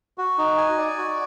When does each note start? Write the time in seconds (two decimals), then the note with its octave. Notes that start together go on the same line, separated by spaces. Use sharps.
0.18 F#4
0.38 D#4
0.57 G#5
0.78 D5
0.98 F#4